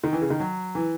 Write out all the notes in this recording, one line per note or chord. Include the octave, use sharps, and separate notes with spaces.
D#3
E3
C#3
D#3
F#3
E3